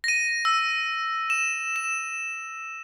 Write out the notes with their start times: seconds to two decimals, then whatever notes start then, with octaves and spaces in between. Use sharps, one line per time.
0.04 A#6 D#7
0.45 E6
1.30 E7
1.76 E7